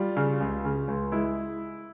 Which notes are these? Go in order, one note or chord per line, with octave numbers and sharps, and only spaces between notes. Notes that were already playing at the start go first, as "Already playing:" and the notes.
Already playing: G3 F4
C#3
C#2
C#3
C#2
G#3 E4